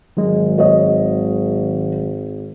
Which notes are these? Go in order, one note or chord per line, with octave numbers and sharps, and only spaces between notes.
G#1 D#3 F#3 G#3
C#5 D#5